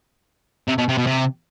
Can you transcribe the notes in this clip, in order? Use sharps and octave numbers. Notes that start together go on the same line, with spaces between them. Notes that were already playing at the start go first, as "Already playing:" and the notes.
C3
B2
C3
B2
C3